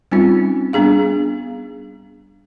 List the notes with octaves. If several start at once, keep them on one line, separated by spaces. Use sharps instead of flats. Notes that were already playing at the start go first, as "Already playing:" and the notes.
G3 C4 C#4 D#4 F4
G3 B3 D4 G#4 F5